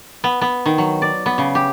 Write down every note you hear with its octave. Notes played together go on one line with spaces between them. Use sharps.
B3
B3
D#3
F#3
D5
B3
C#3
G4